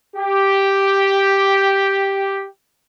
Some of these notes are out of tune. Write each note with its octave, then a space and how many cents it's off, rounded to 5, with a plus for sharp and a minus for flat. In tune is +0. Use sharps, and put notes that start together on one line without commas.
G4 +0